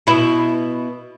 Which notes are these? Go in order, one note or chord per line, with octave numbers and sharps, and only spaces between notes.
B2 E4